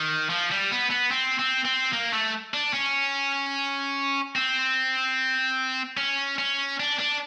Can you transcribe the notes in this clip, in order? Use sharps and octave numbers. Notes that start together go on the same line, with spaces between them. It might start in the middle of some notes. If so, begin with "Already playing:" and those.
Already playing: D#3
F3
G3
B3
B3
C4
C4
C4
A#3
A3
D4
C#4
C4
C#4
C#4
D4
D4